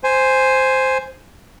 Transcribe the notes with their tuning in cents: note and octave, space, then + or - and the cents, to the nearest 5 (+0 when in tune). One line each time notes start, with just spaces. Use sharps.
C5 +0 G#5 +0